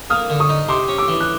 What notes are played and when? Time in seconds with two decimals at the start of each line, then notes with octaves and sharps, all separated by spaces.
0.10 A#3 D#6 F6
0.30 D3
0.40 C#6 D#6
0.49 D#4
0.68 C3 C6 D6
0.88 C#4
0.98 D6 E6
1.08 E3
1.20 F#6